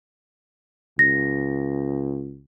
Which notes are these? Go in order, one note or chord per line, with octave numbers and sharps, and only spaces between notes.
C#2 A#6